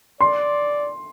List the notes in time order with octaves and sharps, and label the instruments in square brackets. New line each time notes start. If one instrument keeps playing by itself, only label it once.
[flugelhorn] D5 [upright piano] C6